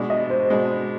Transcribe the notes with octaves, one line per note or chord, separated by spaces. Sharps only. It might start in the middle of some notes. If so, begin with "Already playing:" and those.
Already playing: B2 G#3 D4 D5
D#5
C5
B2 G#3 D4